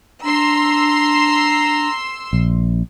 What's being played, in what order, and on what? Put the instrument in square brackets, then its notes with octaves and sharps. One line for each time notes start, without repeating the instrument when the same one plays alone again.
[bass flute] D4 [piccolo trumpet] A#5 [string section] C6 E6
[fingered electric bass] A#1